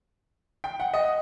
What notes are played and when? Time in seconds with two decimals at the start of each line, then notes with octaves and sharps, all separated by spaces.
0.64 G5
0.80 F#5
0.94 D#5